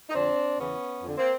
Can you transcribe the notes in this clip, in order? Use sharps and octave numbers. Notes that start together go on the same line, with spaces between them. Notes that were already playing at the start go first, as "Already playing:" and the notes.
D#4
F2 D3 C4 D4
E2 C#3 E3 B3 C#4
F2 D3
A#3 C4